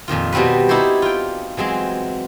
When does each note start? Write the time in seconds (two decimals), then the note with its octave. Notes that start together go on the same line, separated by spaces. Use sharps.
0.08 F2 A#2 D#3 F4
0.32 B2 G3 C4 F#4 B4
0.68 D#4 E4 G4 A4 C5 C#5
1.02 F4 G5
1.57 E3 F#3 G#3 C4